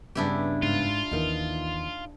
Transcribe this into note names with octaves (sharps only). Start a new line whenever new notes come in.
G2 C#3 B3 D4 E4 G4
G#2 F4
D#2 D#3 E3 D#4 A#4 F5